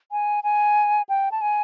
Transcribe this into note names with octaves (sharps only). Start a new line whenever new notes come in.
G#5
G#5
G5
A5
G#5